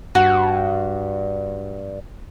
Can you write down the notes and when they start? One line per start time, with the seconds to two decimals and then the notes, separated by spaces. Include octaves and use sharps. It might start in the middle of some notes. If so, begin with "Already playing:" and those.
0.15 G2 F#4